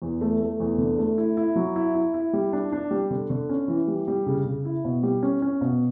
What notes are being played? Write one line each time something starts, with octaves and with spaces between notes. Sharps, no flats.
E2
A3
A3
E2
D3
A3
E4
E4
F#3
E4
E4
E4
G3
D4
D4
G3
D3
D3
C#4
E3
G3
G3
C#3
C#3
E4
B2
G3
C#4
C#4
B2